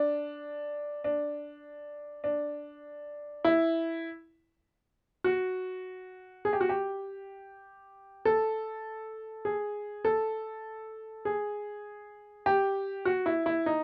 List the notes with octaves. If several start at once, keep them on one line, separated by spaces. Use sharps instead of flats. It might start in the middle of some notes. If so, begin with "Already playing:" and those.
Already playing: D4
D4
D4
E4
F#4
G#4
G4
F#4
G4
A4
G#4
A4
G#4
G4
F#4
E4
E4
D#4